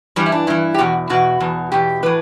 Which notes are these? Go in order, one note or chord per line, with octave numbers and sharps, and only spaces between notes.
G2 E3 G3
E4
D4
G2 E3 E4
G4
E2 B2 F#4
E2 B2 F#4
E2 B2
E2 B2 G4
A2 E3 B4